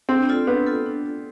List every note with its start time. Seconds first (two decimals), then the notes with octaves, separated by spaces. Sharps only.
0.09 C4 D4
0.29 F4 A4 D5
0.47 B3 D4
0.67 F4 A4 D5
0.86 D4
1.05 F4 A4 D5